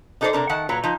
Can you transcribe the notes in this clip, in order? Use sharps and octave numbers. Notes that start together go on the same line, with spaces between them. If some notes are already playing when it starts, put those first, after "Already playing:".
D4 D#4 A4 A#4 C5 D5
C3 D4 A#4
D#3 F#5 A5
A#2 F#3 B4 C#5 A#5
F3 D#4